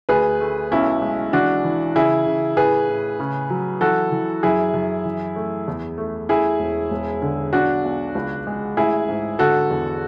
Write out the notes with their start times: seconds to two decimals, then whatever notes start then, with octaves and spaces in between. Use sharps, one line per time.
0.09 D2 G#4 B4
0.41 A3
0.72 B1 C#4 E4
1.02 G#3
1.33 E3 D4 F#4
1.64 E3
1.96 C#3 E4 G#4
2.26 C#3
2.57 A2 G#4 B4
2.89 A2
3.20 C#3
3.50 F#3
3.81 E3 F#4 A4
4.12 E3
4.43 F#2 E4 G#4
4.74 F#2
5.05 E3
5.36 A3
5.68 E2
5.98 A3
6.29 A3 E4 G#4
6.60 E1
6.91 E1
7.22 D3
7.53 B1 D4 F#4
7.84 B1
8.15 C#2
8.47 G#3
8.77 A1 E4 G#4
9.09 G#2
9.39 D3 F#4 A4
9.70 E2